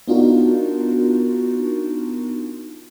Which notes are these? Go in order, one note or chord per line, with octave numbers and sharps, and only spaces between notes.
B3 D4 D#4 F4 F#4 A#4